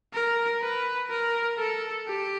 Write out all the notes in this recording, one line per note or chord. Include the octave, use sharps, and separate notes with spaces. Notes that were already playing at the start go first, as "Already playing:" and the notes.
A#4
B4
A#4
A4
G4